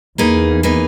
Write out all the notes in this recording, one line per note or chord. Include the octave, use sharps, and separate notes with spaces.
E2 A#3 D#4 G#4 B4
A#3 D#4 G#4 B4